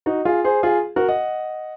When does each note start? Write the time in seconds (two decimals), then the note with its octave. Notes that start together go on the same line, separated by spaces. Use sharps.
0.06 D#4 F#4
0.25 F4 G#4
0.44 G#4 C5
0.63 F4 G#4
0.96 F#4 A#4
1.08 D#5 F#5